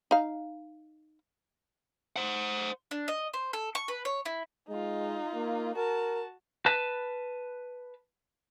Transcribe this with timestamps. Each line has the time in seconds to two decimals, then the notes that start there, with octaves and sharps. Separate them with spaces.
0.11 D#4 F5
2.16 C5 F#5
2.91 D4
3.08 D#5
3.33 C5
3.53 A4
3.75 C#6
3.88 B4
4.05 C#5
4.25 E4
4.69 G#3 D#4 F4
5.35 A#3
5.76 F#4 A#4 A5
6.66 B4 A5